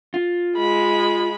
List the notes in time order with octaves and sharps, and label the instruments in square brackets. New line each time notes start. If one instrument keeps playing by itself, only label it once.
[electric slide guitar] F4
[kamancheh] G#3 B5